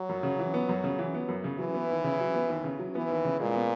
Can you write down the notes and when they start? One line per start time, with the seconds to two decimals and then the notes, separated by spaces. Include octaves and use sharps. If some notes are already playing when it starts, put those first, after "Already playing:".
Already playing: F#3
0.09 F#2
0.23 C#3
0.39 E3
0.54 B3
0.69 F#2
0.84 C#3
0.99 E3
1.15 B3
1.28 F#2
1.44 C#3
1.58 E3 F#3
1.74 B3
1.90 D#2
2.04 C#3
2.20 F#3
2.34 B3
2.49 D#2
2.64 C#3
2.79 F#3
2.95 E3 B3
3.09 D#2
3.25 C#3
3.40 A#2 G#3
3.54 B3